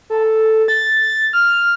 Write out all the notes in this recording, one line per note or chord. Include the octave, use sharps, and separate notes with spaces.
A4
A6
F6